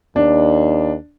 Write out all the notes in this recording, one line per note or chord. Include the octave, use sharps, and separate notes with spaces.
D#2 D4